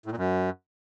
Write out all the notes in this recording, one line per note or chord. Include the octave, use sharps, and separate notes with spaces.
A2
A#2
F#2